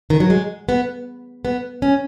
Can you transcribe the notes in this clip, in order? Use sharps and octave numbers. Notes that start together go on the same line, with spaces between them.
D#3
F#3
G#3
B3
B3
C#4